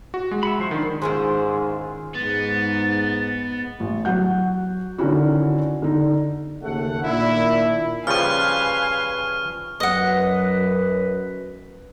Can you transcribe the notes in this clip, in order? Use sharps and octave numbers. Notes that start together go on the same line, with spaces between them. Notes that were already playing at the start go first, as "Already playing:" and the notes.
F#4
G#3
E5 F#5 B5
F3 C5 C#6
D#3 D4
G#2 D#3 G#3 C#4 E4 F4 G#4 C5
G#2 B3 A6
A1
F#3 F#5 G6
D3 D#3 C#4 D#4 E4 F#4
D3 D#4
D#2 C#3 A3 F#5
A#2 D#3 D4 E4
C#3 F3 G3 B4 F5 G#5 C#6 F6
F#2 B4 D#5 F#5